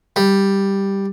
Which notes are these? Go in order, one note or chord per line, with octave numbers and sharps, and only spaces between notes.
G3